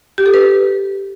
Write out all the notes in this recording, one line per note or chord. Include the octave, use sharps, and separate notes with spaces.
G4
A4
B4